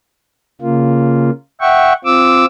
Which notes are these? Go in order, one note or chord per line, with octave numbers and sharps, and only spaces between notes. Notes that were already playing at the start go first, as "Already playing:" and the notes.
C#3 A#3 F4
E5 F#5 G5 C#6
C4 F4 D6 E6